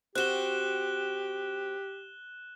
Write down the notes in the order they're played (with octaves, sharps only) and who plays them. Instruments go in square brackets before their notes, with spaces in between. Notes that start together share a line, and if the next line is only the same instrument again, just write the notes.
[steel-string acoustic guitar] C4 F#4 [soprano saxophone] G4 [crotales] F#6 E7 G7